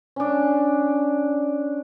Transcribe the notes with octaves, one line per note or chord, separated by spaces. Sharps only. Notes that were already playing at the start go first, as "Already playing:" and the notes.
C#4 D4